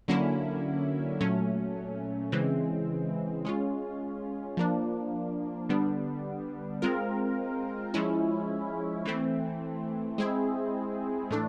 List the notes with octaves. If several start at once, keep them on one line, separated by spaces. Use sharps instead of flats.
D3 F#3 A#3 C#4 E4
A#2 F#3 A3 C#4
C#3 E3 G#3 C4
G#3 C#4 F4
F3 A#3 D4
D3 G3 B3 D4
G#3 C4 F4 A#4
F3 G#3 C#4 E4
E3 A3 C4
G#3 C4 E4 G#4
A2 E3 A3 D4